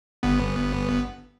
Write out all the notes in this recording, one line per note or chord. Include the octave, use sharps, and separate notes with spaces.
G1 B3